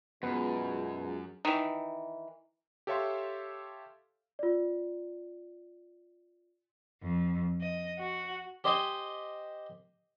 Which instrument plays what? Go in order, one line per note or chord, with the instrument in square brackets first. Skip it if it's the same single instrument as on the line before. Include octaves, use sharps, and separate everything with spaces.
[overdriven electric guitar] F#2 [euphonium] B2 [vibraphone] G#3 F4 G#4 [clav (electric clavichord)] B3 B4
[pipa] D#3 E3
[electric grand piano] G4 A4 C#5 E5 F5 C6
[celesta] F4 D5
[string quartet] F2
D#5
F#4
[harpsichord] G4 C5 D#5 G5 G#5